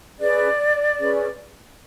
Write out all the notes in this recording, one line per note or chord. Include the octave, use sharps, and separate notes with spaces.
C#4 G#4 B4 D5
C#4 G#4 B4